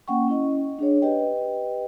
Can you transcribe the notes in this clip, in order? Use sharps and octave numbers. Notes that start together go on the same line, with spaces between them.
A#3 C#4 F#5 G5 C#6
C#4 E4 D#5
D4 G#4 C#5
G4 B4 D#5 G5